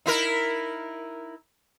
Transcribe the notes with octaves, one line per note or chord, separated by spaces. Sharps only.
D#4 E4 A#4